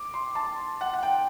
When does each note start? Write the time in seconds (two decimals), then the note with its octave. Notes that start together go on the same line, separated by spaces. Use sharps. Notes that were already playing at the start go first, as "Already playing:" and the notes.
Already playing: D6
0.14 C6
0.35 A5
0.81 F#5
0.93 F#5
1.03 G5